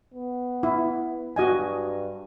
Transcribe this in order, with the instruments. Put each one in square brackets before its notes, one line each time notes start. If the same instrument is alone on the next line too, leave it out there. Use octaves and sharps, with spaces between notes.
[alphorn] B3
[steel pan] E4
[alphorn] G2 [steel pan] F#4 D#5 G#5